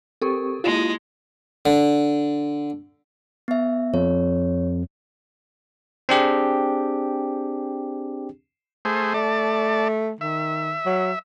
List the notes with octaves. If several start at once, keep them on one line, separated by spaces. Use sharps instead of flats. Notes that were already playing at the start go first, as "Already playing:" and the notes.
C4 G4 A4 A#4 C#6
G#3 A#3 E4 F4 G4
D3
B3 E5
F2 C#5
C4 D4 G4 G#4
A3 G#4 C5
A3 D5 A5
D#3 E5
F#3